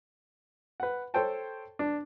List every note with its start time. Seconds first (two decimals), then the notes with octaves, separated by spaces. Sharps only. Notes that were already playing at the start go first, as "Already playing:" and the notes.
0.80 B4 F#5
1.14 A4 C5 C#5 G5 A5
1.79 D4